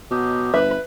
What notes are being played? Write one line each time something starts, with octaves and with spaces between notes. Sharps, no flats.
B2 F#3 G4 D#5
G1 B4 E5